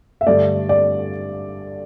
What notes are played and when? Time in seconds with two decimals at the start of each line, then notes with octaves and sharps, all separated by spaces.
0.21 E5
0.26 G2 D3 A3 D5
0.69 D5